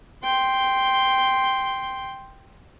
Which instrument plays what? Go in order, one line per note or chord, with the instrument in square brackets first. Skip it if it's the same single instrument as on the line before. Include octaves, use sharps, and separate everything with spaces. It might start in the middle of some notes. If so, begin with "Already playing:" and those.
[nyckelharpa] G5 C6